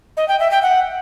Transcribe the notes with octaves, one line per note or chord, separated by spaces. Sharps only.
D#5
G5
E5
G5
F#5